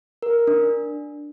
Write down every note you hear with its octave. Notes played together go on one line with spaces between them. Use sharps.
A#4
D4